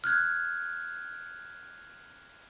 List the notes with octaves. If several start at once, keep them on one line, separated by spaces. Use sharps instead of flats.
F6 F#6 G#6